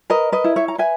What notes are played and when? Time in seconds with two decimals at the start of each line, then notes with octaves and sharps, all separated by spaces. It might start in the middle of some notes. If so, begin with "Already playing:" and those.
0.10 A#4 B4 D#5
0.32 B4 D#5
0.44 E4
0.56 C#5 E5
0.68 A#5
0.78 B4 E5 G#5